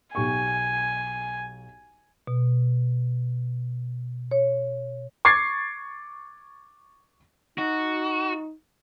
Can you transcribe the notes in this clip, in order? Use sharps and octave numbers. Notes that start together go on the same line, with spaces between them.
B1 G4 G#5 C#6
B2
C#5
C#6 D6 G#6 A6 C7
D#4 F#4